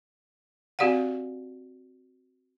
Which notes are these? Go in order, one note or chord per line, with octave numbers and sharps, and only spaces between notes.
C4 F#4 G4 D5 F5 F#5